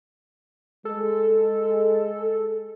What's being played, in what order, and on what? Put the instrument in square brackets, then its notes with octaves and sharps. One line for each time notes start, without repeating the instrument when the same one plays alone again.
[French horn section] G#3 [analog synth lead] A4